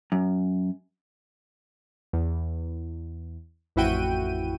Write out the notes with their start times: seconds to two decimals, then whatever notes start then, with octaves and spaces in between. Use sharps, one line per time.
0.12 F#2
2.13 E2
3.76 A1 F2 E4 F#4 G5 D#7